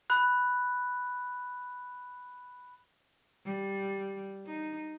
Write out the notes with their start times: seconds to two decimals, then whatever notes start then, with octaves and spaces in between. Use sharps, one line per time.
0.10 B5 F#6
3.45 G3
4.46 D#4